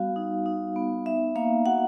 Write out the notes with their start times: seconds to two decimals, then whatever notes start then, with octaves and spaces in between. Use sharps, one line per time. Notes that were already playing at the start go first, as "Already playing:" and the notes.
Already playing: G3 B3 F#4 F5
0.16 D#4
0.46 D#4
0.76 B3
1.06 D#4 E5
1.36 A#3 F5
1.66 F#4 F#5